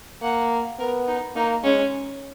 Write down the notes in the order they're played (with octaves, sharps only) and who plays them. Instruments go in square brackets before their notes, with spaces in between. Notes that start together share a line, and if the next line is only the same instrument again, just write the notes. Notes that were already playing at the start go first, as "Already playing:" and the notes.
[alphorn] A#3 [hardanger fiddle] F#5
[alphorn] B3 [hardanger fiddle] A#4
[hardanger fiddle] D#4
[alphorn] A#3 [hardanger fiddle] D#4
[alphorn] G#3 [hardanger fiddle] C#4